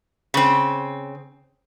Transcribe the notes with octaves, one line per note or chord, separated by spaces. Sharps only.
C#3 C4